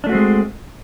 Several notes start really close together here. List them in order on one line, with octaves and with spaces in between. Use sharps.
D4 A3 F#4 C4 G#3